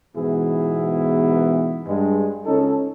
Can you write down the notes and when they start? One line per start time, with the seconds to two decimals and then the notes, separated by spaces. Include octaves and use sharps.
0.15 G#2 B2 E3 B3 E4 G#4
1.86 G2 G#3
2.46 C#2 C#4 D#4 A4